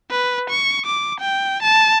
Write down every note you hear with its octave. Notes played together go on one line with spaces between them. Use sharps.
B4
C#6
D6
G5
A5